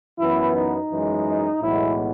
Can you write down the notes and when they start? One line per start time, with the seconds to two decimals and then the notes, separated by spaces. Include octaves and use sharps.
0.18 F#2 E3 B3 E4
0.53 D#4
0.89 F#2 E3 G#3
1.60 B1 A2 E3 G#3 B3 E4